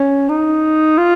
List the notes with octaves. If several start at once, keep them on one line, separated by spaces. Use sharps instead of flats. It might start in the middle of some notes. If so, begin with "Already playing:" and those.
Already playing: C#4
D#4
F4